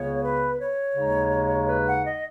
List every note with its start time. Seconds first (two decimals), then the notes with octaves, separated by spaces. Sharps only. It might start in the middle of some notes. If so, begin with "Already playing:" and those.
Already playing: C#2 C#3 B3 C#5
0.22 B4
0.59 C#5
0.95 D#2 C#3 G#3 D#4
1.68 B4
1.86 F#5
2.05 D#5